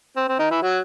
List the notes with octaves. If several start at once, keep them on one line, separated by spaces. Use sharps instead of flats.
C4
C4
D#3 D#4
E3 E4
F#3 F#4